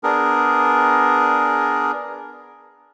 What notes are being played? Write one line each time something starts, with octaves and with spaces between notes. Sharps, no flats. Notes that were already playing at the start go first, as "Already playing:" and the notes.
B3 D4 G#4 A#4